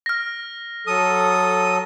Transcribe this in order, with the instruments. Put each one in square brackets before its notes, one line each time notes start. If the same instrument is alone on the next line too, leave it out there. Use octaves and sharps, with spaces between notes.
[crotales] F6 A#6
[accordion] F#3 A4 [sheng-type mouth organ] D#6